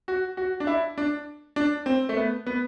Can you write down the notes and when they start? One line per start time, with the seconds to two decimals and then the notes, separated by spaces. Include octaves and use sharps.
0.08 F#4
0.37 F#4
0.60 D4
0.67 E4
0.98 D4
1.56 D4
1.86 C4
2.09 A3
2.17 B3
2.46 B3